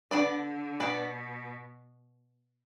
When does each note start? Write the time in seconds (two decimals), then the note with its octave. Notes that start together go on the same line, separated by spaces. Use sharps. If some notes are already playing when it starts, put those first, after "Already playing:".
0.11 D3 B3 D4 B4 D5
0.80 B2 B3 D4 B4 D5